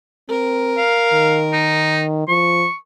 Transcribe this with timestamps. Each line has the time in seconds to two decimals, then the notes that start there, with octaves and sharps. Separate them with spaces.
0.29 C4 A#4
0.77 F5
1.13 D#3
1.53 D#4
2.28 F3 C#6